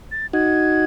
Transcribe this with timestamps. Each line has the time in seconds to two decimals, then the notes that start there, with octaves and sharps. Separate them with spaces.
0.11 A6
0.33 D#4 F#4 G#6